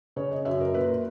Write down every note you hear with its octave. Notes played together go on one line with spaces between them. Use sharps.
C#3 C#5
D#5
F#2 E5
A#4
A#2 B4